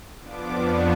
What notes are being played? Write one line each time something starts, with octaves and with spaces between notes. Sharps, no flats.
F2 F3 B3 D4 D6
C#6